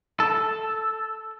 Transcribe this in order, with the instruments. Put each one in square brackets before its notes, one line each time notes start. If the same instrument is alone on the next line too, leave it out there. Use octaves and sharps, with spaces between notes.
[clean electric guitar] A4